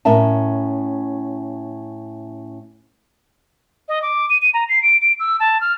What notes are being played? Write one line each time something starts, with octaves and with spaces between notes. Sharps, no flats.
A2 C#4 A#4 E5 A5
D#5
D6
D#7
D#7
A#5
C7
D7
D7
E6
A5
F6